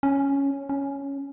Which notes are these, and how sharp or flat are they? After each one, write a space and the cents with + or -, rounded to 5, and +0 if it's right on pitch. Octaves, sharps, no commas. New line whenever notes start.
C#4 +0
C#4 +5